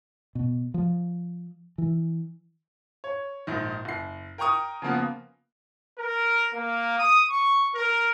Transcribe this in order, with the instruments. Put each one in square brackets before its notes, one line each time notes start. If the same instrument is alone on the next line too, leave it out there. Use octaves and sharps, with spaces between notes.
[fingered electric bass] B2
F3
E3
[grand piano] C#5
A#1 G#2 D#3
F#1 C7
A#4 G5 A#5 C#6 D#6
C#3 F3 A#3 B3
[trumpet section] A#4
A#3
D#6
C#6
A#4